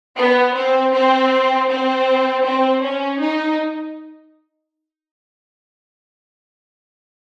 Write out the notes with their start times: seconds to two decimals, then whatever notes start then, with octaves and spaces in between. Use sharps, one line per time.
0.17 B3
0.55 C4
0.93 C4
1.69 C4
2.46 C4
2.83 C#4
3.21 D#4